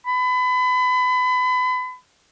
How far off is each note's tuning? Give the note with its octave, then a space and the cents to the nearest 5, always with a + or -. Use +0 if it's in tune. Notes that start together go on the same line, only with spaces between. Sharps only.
B5 +30